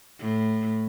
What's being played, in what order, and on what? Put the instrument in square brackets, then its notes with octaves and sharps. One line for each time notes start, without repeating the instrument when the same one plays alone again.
[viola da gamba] A2